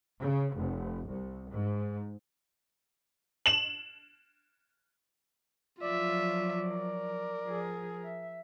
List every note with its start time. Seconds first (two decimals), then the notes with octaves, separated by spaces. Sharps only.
0.19 C#3
0.53 F1
1.07 C2
1.51 G#2
3.46 E7 F#7
5.81 F3 F#3 F4 D5 E5
6.71 A#4
7.44 F3 G#4
8.03 E5